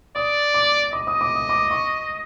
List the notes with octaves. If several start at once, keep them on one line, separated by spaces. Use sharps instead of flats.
D5 D#6
D6
D#5 D6
D#6
D6
D#6
D6
C#6